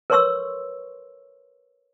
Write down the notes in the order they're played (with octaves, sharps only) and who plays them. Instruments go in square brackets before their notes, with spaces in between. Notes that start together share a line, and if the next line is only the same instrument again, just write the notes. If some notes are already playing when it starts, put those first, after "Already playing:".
[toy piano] A#4 B4 C#5 C6 C#6 E6